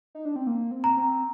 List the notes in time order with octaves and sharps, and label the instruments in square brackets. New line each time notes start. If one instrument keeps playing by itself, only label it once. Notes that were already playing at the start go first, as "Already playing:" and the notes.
[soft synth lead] D#4
D4
C4
A#3
C4
[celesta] A#5
[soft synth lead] C4